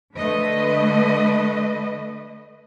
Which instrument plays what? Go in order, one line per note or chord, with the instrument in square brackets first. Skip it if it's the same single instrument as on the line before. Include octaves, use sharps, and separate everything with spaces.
[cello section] D3 A3 B4 D#5